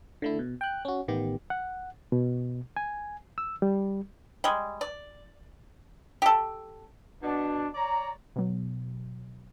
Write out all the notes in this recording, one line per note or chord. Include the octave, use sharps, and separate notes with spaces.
D3 A3 E4
B2
G5 F#6
C#4 F#4
A1 D#3 B3 G4
F#5
B2
G#5
E6
G3
G3 G#3
D5
G4 A4
B2 D4
C#5 D5 A#5
B2 F#3